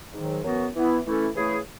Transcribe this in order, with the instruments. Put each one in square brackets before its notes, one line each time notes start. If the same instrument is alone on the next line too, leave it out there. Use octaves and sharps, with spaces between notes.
[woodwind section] G#2 D#3 F#3
F#2 E3 B3 F#4
E3 B3 E4
E3 A3 C#4 E4 A4
C#3 E3 A3 E4 G#4